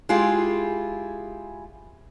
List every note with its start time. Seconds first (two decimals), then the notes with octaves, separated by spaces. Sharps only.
0.09 G#3 E4 F4 G4 G#4